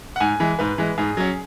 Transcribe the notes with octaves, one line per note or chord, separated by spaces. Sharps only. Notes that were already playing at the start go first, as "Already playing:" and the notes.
F#5
G#2 G#5
E3 G#3
G#2 B4
E3 G#3
G#2 G#4
F#3 C#4